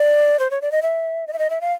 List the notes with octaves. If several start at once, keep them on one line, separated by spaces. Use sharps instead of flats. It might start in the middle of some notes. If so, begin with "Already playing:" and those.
Already playing: D5
C5
C#5
D5
D#5
E5
D#5
E5
D#5
E5
F5